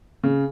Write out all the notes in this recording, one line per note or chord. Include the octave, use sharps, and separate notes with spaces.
C#3